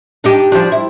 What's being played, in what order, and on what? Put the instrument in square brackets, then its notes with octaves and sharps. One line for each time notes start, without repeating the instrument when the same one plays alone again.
[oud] D4 D#4 G4
F3 G3 D4
E4